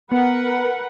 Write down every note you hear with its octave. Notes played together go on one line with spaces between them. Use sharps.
B3 A#4 B4 F#5